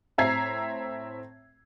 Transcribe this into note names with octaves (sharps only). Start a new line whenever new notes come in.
A2 C4 E5 A#5 G#6 C7